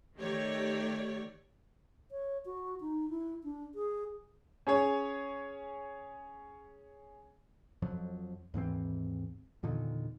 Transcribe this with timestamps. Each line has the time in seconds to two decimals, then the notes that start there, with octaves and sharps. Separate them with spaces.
0.17 D#3 A3 G4 C#5 D5
2.11 C#5
2.46 F#4
2.81 D#4
3.10 E4
3.44 D4
3.75 G#4
4.67 C#4 G#4 C#5
7.82 F2 F3 F#3
8.54 D#2 G#2 E3 C4
9.63 E2 A#2 D3 D#3